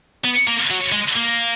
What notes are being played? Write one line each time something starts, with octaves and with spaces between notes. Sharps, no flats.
B3
A#3
F#3
G#3
A#3